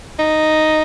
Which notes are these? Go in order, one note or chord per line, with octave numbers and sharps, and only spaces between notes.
D#4